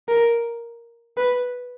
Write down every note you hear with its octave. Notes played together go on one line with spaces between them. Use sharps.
A#4
B4